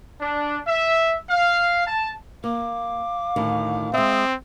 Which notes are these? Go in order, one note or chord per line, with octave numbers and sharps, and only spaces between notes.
D4
E5
F5
A5
A#3 F5 D6
D2 A2 D#3
G#3 C4 E5 D#6